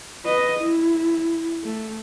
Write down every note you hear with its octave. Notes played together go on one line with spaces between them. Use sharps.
B4 D#5
E4
A3